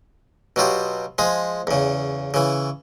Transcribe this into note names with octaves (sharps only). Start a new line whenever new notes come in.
B2 F#3 F4 G4
F3 G#3 G#4
E2 C#3
C#3 E3